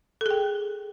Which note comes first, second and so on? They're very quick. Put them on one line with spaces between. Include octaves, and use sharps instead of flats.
A4 G#4 G5